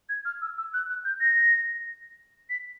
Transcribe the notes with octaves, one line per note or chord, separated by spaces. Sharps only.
G#6
F6
E6
E6
F#6
F#6
G6
A#6
B6